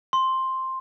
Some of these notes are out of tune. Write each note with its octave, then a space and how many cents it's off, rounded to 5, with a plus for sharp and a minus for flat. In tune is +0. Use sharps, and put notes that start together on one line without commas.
C6 +5